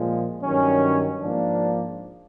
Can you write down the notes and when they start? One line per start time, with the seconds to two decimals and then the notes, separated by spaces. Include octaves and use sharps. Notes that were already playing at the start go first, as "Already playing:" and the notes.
Already playing: A#2 F3 G#3
0.43 G2 D#3 F#3 C#4
1.22 G#2 F3 A#3 D4